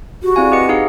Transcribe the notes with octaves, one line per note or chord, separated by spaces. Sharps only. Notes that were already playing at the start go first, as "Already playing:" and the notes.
F#4 G4
C4 E4 G#4 D5 F5 G#5
G4 B4 D#5 F#5 C#7
D#4 G#4 F5